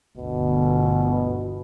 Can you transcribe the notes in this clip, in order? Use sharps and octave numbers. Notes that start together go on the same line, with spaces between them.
G1 D2 B2